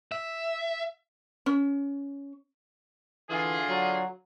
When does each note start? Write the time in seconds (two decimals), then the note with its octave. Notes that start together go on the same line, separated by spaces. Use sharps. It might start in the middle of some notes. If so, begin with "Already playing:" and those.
0.12 E5
1.46 C#4
3.30 D3 E3 F4 G#4
3.69 F#3